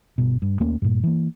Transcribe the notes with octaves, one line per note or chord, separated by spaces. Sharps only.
G1 B2
G2
D#2 A3 A#3 C#4
G2 A#2
E3 A#3